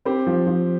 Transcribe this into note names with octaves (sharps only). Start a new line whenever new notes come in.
C4 G4 C5
F3
F3